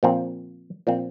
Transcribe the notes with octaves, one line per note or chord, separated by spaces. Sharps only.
A#2 F3 C4
A#2 F3 C4